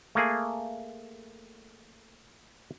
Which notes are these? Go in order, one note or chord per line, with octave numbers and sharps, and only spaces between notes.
A3 A#3 G#4